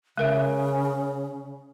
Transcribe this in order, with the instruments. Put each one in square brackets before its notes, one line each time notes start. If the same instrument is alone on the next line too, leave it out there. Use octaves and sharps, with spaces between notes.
[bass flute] C#3 [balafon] G#3 A#4 E5